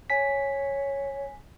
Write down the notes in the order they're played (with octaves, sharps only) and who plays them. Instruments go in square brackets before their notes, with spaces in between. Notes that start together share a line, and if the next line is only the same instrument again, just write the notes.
[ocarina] C#5 [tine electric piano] G#5 B6